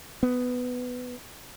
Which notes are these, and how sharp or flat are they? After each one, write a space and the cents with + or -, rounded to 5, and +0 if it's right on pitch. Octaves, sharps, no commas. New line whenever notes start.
B3 +10